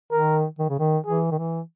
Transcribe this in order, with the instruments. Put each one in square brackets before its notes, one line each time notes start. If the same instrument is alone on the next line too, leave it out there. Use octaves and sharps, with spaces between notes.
[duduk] D#3 [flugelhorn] A#4
[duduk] D#3
C#3
D#3
[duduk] E3 [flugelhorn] G#4
[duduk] D#3
E3